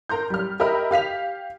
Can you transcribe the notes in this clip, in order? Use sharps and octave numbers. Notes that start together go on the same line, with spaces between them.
A#4 A#5 C6 G6
G3 F6
G4 A#4 D#5 E5 B5 F6
G4 F5 B6 F7